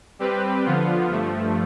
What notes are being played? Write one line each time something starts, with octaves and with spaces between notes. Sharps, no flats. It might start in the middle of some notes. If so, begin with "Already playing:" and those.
G3 C4 G4 B4
D3 F3 B3 F4
G2 F3 A3